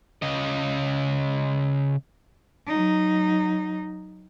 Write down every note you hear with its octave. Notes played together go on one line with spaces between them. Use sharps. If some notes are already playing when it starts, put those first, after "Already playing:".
C#3 D#5
F#3 D#4